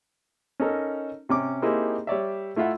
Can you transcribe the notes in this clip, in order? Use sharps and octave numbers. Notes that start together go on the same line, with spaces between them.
C#4 D#4 A4 A#4
C3 C#4 D6
A#3 C4 D#4 E4 G4 G#4
G3 C#5 D5 E5
A3 E4 F4 E5 F#5